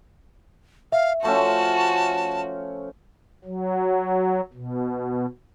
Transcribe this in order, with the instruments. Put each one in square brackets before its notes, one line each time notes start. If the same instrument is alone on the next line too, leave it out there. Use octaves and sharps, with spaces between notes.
[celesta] E5 [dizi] F5
[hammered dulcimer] F3 A3 C#4 [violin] F#4 [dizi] A5
[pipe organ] F#3
B2